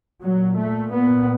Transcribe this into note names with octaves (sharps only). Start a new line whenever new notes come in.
A#2 F#3
A3
B3